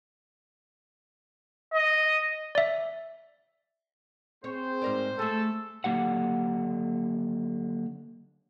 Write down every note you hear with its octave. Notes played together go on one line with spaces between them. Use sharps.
D#5
D5 E5
C4 G#4 C5 C#5
G#2 A#4 D5
A3 G#4 A4
D3 F#3 A#3 G4 F#5